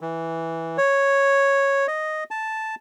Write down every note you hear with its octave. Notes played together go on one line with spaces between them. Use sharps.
E3
C#5
D#5
A5